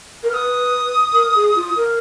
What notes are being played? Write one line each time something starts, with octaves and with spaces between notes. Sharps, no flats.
A#4
B4 D#6 F6
A#4
G#4
F4
A#4